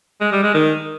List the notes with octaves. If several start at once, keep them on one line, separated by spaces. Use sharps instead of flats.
G#3
G3
G#3
D#3